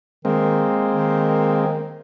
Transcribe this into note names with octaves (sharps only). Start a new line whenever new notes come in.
D#3 G#3 A#3 C4
D#3